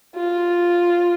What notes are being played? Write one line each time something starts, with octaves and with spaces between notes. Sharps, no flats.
F4